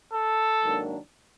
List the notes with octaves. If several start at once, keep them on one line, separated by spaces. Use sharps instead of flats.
A4
G#2 D#3 F#3 A#3 D4